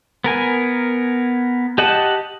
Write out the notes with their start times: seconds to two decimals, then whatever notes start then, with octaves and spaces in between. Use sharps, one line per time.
0.24 B3 A#4 G#5
1.78 G4 D#5 F#5 A5